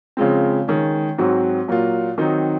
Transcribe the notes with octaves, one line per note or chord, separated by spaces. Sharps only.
C#3 F3 G#3 C4
D#3 G#3 C#4
G#2 F#3 C4 F#4
A#2 F#3 A#3 F4
D#3 F#3 C4 D#4